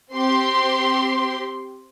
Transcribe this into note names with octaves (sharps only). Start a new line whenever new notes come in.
C4 G4 C6